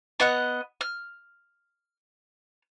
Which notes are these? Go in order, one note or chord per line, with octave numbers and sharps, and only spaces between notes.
B3 D#5 F#5 F#6
F6